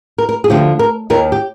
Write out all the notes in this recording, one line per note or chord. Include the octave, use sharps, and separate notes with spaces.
A#4
A#4
G#4
D2 D3 F3 G4
A#4
D#2 D#3 A#4
G4